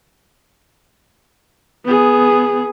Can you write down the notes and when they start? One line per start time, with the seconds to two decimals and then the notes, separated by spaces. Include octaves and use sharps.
1.85 B3 G#4